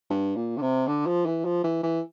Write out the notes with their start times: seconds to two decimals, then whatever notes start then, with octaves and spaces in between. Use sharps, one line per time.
0.10 G2
0.36 A#2
0.57 D3
0.61 C3
0.87 D3
1.06 F3
1.26 E3
1.45 F3
1.64 E3
1.83 E3